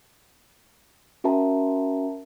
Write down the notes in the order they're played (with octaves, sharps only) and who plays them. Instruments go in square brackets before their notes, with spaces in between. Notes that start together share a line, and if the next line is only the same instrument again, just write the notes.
[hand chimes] C#4 F#4 A#4 E5 A5 A#5